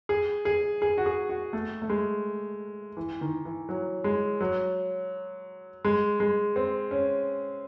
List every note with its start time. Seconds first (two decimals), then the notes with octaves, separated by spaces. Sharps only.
0.09 G#4
0.45 G#4
0.82 G#4
0.98 F#4
1.06 G#4
1.29 F#4
1.53 A3
1.82 A3
1.89 G#3
2.97 E3
3.21 D#3
3.45 E3
3.69 F#3
4.04 G#3
4.41 F#3
5.85 G#3
6.20 G#3
6.56 C4
6.91 C#4